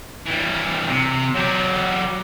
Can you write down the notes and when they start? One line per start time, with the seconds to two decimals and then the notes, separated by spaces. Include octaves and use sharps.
0.26 E3 G3
0.88 C3
1.34 F#3 G4